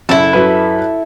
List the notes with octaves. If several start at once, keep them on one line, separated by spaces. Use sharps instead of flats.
F#1 E4 A4
F#2 B4